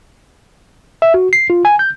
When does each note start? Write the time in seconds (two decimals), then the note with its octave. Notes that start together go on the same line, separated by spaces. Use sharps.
1.02 E5
1.14 F#4
1.33 C7
1.50 F4
1.65 G#5
1.79 G6